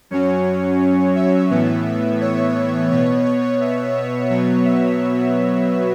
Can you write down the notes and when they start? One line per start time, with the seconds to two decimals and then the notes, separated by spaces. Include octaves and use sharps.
0.10 F#2 F#3 C#4 C#5
0.81 C#5
1.15 E5
1.50 A2 E3 B3
2.21 C#5
2.91 B2 B3 C#5
3.25 C#5
3.61 E5
4.30 B2 F#3 B3 C#5
4.65 E5